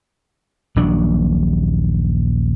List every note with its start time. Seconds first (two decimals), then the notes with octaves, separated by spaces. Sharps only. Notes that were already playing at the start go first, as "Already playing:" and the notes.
0.76 D#1 A#1 F#3 D4